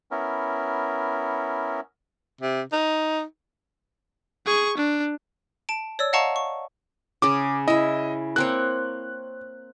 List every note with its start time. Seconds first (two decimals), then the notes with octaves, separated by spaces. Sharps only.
0.11 B3 C#4 E4 A#4
2.41 C3
2.72 D#4
4.46 G#4 C#6
4.77 D4
5.69 A5 D7
5.99 C#5 D5 E6
6.13 D#5 F5 F#5 A5 A#5 C#6
6.36 C#6
7.22 C#3 C#4 G#4 D6
7.68 E4 D#5 E5
8.36 A#3 C4 C#5 F#6